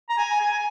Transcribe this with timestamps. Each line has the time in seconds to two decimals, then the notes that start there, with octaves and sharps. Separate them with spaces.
0.10 A#5
0.18 G#5
0.40 G#5